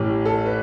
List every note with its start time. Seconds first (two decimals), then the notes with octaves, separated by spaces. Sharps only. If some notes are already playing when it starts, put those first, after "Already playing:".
Already playing: A1 A2 E3 G4
0.25 A4
0.46 B4